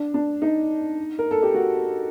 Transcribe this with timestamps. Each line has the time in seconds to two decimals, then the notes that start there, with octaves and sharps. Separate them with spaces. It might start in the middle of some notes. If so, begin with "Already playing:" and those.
Already playing: D4
0.14 D4
0.42 D#4
1.19 A#4
1.31 A4
1.42 G4
1.54 F#4